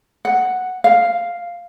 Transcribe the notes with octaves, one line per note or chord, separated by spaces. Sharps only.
F#5
F5